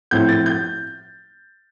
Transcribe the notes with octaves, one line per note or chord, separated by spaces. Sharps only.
A2 F3 C4 E4 G6
A6
G6